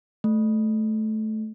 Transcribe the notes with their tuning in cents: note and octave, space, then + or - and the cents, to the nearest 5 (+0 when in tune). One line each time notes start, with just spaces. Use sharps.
A3 -15